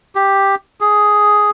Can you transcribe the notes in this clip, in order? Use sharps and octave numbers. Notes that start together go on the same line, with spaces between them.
G4
G#4